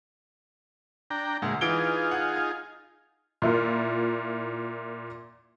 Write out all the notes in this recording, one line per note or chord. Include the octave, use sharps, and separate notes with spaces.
D4 G5 A#5
D2 A#2 G#3
E3 D#4 F4 G#4 D7 G7
F#5
G#6
A#2 E4 F4 A#4